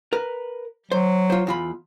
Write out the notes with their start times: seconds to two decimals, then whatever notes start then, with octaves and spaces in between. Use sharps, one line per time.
0.13 A#4 B4
0.92 F#3 C5
1.30 F4 C5
1.47 E2 F4 B5